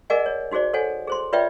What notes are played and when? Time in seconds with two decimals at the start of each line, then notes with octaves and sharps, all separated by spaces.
0.10 G#4 A#4 D5 D#5 F#5 G#5
0.26 C#5
0.51 D#4 F#4 G#4 C5 D5
0.73 A4 C5 C#5 F#5 G#5
1.08 G#4 C5 C6
1.33 F4 B4 C#5 D5 E5 G5